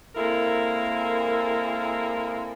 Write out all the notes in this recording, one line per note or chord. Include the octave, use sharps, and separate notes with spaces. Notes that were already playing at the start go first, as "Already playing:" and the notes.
G#3 A#3 C4 E4 A4 A#4